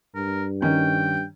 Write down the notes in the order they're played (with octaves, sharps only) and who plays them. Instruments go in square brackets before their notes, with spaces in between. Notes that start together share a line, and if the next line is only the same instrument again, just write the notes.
[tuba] G2 [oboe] A#4
[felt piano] D#3 C#4 [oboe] G5